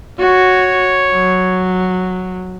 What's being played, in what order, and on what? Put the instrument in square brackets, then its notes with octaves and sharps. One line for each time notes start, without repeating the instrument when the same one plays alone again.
[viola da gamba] F#4 [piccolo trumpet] C#5
[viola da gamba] F#3